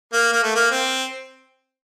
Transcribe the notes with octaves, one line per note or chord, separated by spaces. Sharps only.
A#3
A#3
A3
A#3
C4